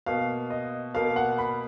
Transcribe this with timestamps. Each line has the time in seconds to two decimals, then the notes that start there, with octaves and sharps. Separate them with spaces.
0.06 B2 A#3 F5
0.50 D#5
0.94 B2 A#3 F5
1.16 F#5
1.38 B5